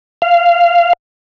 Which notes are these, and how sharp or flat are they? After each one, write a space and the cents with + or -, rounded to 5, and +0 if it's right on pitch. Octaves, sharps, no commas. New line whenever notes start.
F5 -15